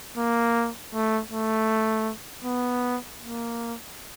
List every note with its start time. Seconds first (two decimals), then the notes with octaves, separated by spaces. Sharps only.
0.17 A#3
0.94 A3
1.32 A3
2.44 B3
3.21 A#3